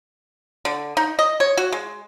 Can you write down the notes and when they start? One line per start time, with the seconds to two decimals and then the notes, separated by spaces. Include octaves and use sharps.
0.65 D3
0.97 D#4
1.19 D#5
1.40 C#5
1.57 F#4
1.72 G#3